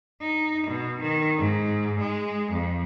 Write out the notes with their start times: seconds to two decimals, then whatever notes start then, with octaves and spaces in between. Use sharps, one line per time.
0.22 D#4
0.68 B2
1.02 D#3
1.38 G#2
2.01 G#3
2.53 F2